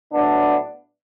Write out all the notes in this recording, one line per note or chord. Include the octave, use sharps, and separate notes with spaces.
A2 F#3 B3 D4